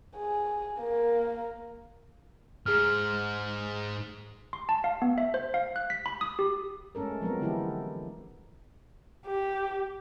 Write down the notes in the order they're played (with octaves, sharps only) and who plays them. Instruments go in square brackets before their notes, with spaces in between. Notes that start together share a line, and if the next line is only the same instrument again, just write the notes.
[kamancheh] G#4
A#3
[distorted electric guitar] G#2 [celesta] G#4 F6
[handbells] C6
A5
F5
B3
E5
C5
F5
F#6
B6
B5
D#6
G4
[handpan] G#3 A3 C#4 A4 A#4
F3 F#3 G#3 B3 C4 A#4
D3 E3 B3 E4 G4 A4
[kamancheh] G4